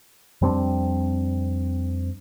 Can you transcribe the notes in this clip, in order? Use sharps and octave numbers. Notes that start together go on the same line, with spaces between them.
F2 G3 C4 D4